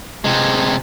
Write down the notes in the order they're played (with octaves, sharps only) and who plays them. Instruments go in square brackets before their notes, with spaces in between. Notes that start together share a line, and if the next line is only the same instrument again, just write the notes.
[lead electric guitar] C3 G#3